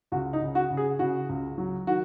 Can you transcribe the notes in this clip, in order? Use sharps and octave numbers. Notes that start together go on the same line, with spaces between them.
C#2 F#4
D#4
C#3
F#4
C#3
G#4
C#3 F#4
C#2
F#3
D#3 F#4